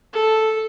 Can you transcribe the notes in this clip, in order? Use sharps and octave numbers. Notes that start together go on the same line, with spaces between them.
A4